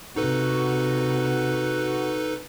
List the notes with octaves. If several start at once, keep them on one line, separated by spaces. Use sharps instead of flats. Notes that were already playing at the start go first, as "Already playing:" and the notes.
C3 D#4 F#4 A4 B4